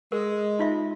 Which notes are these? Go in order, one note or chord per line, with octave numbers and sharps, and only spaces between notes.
G#3 A#4
D#4 F4 E5